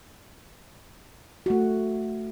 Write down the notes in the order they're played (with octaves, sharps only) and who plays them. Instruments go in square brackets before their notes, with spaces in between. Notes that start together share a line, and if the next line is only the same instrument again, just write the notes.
[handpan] A3 F#4